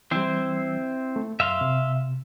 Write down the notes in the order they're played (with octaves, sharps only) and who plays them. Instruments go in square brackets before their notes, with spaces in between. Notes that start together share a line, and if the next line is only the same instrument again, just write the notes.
[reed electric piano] E3 G3 [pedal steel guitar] C4 E4 C5
[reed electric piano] A3
[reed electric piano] F#2 [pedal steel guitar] E5 F5 C6
[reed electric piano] C3